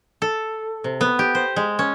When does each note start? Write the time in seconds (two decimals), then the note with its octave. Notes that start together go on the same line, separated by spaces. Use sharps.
0.22 A4
0.84 C3
1.01 B3
1.19 G4
1.35 C5
1.56 G#3
1.79 C#4